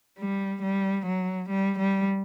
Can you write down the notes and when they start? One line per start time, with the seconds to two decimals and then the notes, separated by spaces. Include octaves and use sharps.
0.18 G3
0.62 G3
1.06 F#3
1.49 G3
1.78 G3